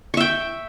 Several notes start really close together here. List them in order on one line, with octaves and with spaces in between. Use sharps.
C#6 E5 G5